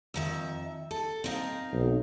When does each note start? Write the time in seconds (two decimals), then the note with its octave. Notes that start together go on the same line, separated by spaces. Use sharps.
0.14 F2 D#3 E5
0.91 A4
1.24 C4 D#4 F5
1.73 B1